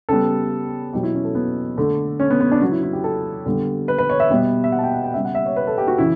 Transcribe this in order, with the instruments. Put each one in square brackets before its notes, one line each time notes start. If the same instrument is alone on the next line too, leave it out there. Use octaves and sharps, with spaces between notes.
[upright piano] C#3 G3 B3 A4
B2 F#3 B3 G4
E4
C#4
A4
B3
D3 A3
C#4
B3
B3
D4
C#3 F#3 B3 F#4
E4
E4
G4
A4
D3 G3 B3
B4
B4
C#5
E5
B2 G3 B3
E5
F#5
A5
G5
F#5
G5
C#3 G3 B3 E5
F#5
E5
C#5
B4
A4
G4
F#4
C#3 E3 E4